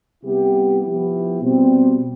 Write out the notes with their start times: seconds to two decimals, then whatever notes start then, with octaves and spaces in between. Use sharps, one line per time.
0.23 C3 G3 B3 E4 G4
0.82 F3 B3 E4 G4
1.41 B2 G3 C4